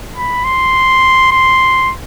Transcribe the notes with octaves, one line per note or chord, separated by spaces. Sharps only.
B5
C6
C6